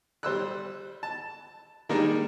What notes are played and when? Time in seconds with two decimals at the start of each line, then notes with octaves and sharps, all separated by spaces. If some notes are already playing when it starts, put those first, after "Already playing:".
0.23 G3 C5 E6 F#6
1.03 A5
1.89 D#3 G3 G#3 A#3 D4 A#4